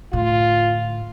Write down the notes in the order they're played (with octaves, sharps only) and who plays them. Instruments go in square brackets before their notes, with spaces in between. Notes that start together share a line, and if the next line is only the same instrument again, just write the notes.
[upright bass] A2 D3 [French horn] F4